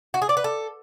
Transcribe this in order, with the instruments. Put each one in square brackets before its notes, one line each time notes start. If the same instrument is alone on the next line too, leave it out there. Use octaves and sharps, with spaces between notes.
[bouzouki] F#4
G#4
D5
B4
A4